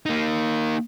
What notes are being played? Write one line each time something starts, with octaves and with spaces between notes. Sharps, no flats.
A#3 D#4